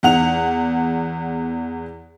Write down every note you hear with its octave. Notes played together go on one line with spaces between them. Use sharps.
E2 F#5 F7